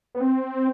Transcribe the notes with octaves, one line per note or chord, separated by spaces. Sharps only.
B3
C4